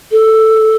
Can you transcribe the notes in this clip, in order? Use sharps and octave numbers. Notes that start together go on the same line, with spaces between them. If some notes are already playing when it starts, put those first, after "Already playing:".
A4